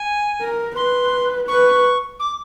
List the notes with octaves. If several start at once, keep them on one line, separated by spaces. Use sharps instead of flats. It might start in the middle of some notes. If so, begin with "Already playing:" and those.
Already playing: G#5
A#4
B4 C6
B4 C#6
D6